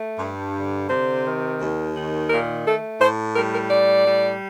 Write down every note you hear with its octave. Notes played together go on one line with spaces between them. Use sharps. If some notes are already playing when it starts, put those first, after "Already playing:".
Already playing: A3
G2
D3
C3 C5
D#3
D#2
D#3
A#2 A#4
A3 A4
A2 C5
G3 A#4
A#4
A2 D5
G3